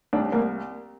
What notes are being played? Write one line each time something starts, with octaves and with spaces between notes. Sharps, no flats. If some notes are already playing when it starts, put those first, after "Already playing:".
C2 D4
C2 A#3